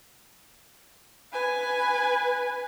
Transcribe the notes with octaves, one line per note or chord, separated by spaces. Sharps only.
B4 G#5